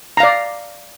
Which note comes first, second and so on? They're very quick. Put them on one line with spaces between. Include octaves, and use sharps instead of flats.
A#5 F5 D5